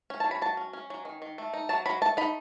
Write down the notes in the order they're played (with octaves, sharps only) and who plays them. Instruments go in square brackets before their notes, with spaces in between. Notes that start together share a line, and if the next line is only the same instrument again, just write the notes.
[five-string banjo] C#4
A5
F#3
B5
F#3 A5
C#4
C#4
F#3
D#3
D#3
A3
D#4
F#3 A5
F#3 B5
A3 A5
D#4 B5